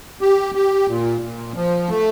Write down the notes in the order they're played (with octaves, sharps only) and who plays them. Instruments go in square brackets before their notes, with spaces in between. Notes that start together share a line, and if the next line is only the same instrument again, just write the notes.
[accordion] G4
G4
A#2
A#2
F3
A3